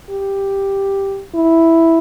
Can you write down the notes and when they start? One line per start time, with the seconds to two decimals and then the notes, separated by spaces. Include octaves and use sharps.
0.10 G4
1.35 E4